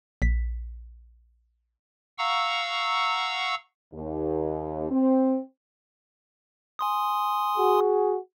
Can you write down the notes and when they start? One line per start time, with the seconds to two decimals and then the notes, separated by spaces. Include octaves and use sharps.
0.22 A#1 B6
2.18 F5 F#5 A#5 C#6 E6
3.93 D#2
4.90 C4
6.79 G#5 C6 D#6
7.58 F#4 G#4